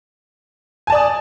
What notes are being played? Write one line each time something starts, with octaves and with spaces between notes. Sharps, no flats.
D5 G#5 A5 D#6